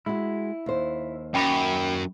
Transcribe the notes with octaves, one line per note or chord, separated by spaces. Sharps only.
G#3 E4 F#4
D#2 C5
F#2 G5 B5